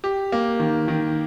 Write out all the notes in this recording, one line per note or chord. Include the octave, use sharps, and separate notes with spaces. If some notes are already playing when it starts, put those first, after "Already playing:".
G4
A#3
D#3
D#3